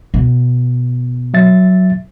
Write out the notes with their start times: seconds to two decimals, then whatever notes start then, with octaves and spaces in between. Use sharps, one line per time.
0.14 B2
1.34 F#3 E5 A6